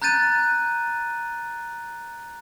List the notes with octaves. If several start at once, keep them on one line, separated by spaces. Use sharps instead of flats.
A#5 F#6 G6 A6 D#7